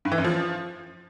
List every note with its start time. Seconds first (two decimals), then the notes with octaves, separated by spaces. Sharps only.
0.05 G2
0.12 E3
0.18 F#2
0.24 F3